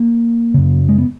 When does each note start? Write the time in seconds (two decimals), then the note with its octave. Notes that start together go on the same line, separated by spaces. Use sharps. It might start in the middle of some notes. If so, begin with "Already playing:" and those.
Already playing: A#3
0.54 F#2 C#3
0.89 G#3
0.98 B3